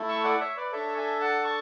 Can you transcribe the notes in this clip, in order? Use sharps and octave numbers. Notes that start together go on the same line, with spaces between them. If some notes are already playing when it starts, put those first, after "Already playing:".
Already playing: A3 E4 A4
C#6 E6
D5 F#5
C#5 E5
B4 D5
D4 A4 C#5 E5
E5 G#5
F#5 A5
A5 C#6